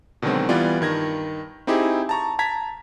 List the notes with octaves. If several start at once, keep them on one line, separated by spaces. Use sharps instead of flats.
B2 D3 D#3 F#3 G#3 C4
E3 G3 B3 F4 D5
G2 D#3 G#6 A#6
C4 D#4 E4 G4 G#4
A5 A#5 C#6
A5 A#5 G#6 B6